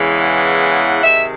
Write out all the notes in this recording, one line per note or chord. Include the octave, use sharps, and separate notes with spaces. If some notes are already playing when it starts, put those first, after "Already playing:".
Already playing: E2 C#3 E3 G#3
F#5
C3 D#3 G#3 E5